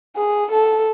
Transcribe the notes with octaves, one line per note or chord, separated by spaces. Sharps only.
G#4
A4